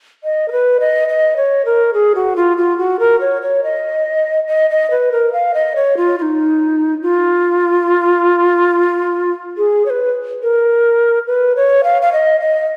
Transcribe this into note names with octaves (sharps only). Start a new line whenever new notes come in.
D#5
A#4
B4
D#5
D#5
C#5
A#4
G#4
F#4
F4
F4
F#4
A#4
C#5
C#5
D#5
D#5
D#5
B4
A#4
F5
D#5
C#5
F4
F4
D#4
F4
G#4
C#5
B4
A#4
B4
C#5
F5
F5
D#5
D#5